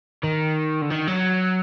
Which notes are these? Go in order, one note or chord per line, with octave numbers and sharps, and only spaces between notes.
D#3
D3
D#3
F#3